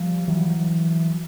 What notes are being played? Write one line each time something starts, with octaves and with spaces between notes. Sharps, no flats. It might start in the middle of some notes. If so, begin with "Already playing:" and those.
Already playing: F3 G3
E3 F#3